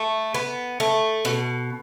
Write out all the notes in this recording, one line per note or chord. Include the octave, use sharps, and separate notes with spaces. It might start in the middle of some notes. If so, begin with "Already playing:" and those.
Already playing: A3
B3
A3
B2